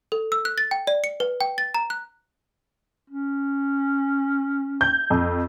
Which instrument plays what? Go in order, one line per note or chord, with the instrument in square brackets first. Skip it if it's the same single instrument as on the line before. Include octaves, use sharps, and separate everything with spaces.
[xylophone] A4
E6
F#6
A6
G5
D5
C#7
B4
G5
A6
A#5
F#6
[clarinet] C#4
[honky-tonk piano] G6
F2